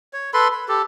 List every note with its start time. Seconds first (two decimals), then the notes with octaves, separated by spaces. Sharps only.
0.13 C#5
0.34 A4 B4 B5 C6
0.53 B5
0.68 G4 A4